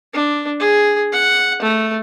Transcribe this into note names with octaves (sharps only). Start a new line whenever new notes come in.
D4
G#4
F#5
A3